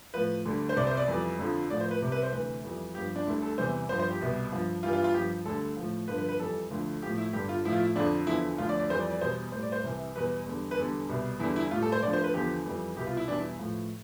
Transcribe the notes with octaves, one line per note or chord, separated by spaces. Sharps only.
A2 F3 B4
D2 D3 G3
C5
C2 C3 G3 D5
C5
D5
F2 E3 G3
F2 D3 F3
A2 F3 D5
C5
B4
C2 C3 G3
B4
C5
D2 C3 E3 B4
F2 E3 G3
G2 F3 G4
D4
D2 D3 G3 E4
A4
E2 C3 E3 G3 C5
G2 F3 C5
C5
G4
C2 B2 G3
G2 F3
G2 E3 G3 F4
F4
F4
G2 F3 G4
D2 D3 G3 A4
A2 F3
G2 D3 F3 B4
B4
B4
F2 E3 G3 A4
D2 D3 F3
A2 F3 G4
E4
G2 D3 G3 G4
F4
A2 F3 E4
F4
E4
F2 D3 F3 D4
E2 D3 F3 E4
D2 D3 F3 F4
D5
D5
F2 E3 G3 C5
D5
D5
E2 B2 G3 C5
A2 G3 C5
D5
C5
C2 C3 E3
E2 B2 G3 B4
E2 D3 G3
B4
E2 D3 G3 A4
C2 B2 G3
E2 D3 G3 E4
E4
A2 G3 F4
A4
C5
D2 D3 F3 D5
C5
B4
E2 D3 F3 G4
F2 E3 G3
C2 B2 G3 G4
F4
E4
E2 B2 G3 D4
E4
A2 F3